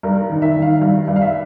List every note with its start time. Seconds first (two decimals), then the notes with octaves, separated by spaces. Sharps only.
0.03 G2 A#4
0.30 D#3
0.42 E5
0.56 D#3
0.62 F5
0.81 G2 F5
1.07 G2
1.16 F5
1.22 E5